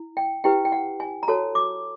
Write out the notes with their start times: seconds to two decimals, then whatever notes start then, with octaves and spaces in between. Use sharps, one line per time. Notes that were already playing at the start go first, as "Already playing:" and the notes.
Already playing: E4
0.17 G5
0.44 E4 G4 B4 G5
0.65 G5
0.72 F#5
1.00 G#5
1.23 A#5
1.28 F#4 A4 C#5 A5
1.55 D6